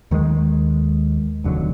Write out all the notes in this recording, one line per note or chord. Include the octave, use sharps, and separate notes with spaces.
D#2 D#3 G#3
F1 D#2 D3 F#3